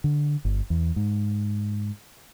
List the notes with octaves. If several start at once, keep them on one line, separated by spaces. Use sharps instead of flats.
D3
G1
E2
G#2